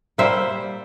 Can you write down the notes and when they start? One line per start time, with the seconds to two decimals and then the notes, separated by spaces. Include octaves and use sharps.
0.18 G3 A#3 C5 E5